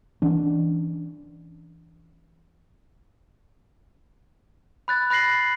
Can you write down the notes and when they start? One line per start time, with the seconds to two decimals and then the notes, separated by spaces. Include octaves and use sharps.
0.22 E3 C#4 D4
4.88 B5 F#6 A6
5.10 B5 F#6 A#6 C7 F#7